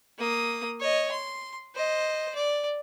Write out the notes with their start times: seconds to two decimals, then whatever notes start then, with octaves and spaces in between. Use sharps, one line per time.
0.19 A#3 D#6
0.80 C#5 D#5
1.11 C6
1.75 C5 D#5
2.35 D5